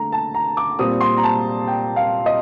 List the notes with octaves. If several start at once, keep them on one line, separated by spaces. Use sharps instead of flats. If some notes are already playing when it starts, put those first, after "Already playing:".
Already playing: D3 A3 A#5
A5
A#5
D6
A#2 G3 C4 D#6
C6
A#5
A5
G5
F5
D#5